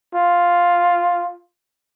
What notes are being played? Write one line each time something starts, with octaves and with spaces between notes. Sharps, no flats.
F4